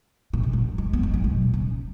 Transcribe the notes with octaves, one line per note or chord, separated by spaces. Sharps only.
B2
C#3
F#3
G#3
B3
G#3
F#3
B2
C#3